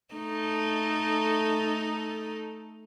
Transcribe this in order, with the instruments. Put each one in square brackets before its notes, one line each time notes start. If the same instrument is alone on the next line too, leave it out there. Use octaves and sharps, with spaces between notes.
[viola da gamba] A3 D#4 A4